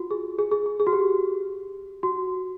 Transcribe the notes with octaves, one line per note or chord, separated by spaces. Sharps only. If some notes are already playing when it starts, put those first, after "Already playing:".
Already playing: F4 F#4
G#4
G#4
G#4
G#4
G#4
F#4
G4
F#4